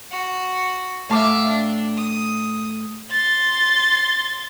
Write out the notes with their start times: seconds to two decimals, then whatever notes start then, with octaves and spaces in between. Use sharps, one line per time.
0.11 F#4
1.09 A2 E5 F5 A5 D6
1.48 D4
1.97 D#6
3.11 C6 A6